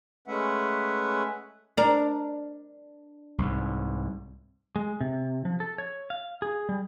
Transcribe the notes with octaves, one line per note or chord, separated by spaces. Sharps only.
G#3 A3 C#4 B4 E5 F#5
D4 A#4
C2 G#2
G#3
C3
F3
A4
C#5
F5
G#4
G3